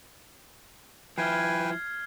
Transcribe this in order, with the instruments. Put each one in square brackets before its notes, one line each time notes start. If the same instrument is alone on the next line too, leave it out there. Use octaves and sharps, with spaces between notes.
[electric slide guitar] F3 E4 [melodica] B4 G5 G#5 [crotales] F6 G#6 C7